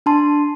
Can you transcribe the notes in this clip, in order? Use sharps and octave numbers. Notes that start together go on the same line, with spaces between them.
D4 A5 C6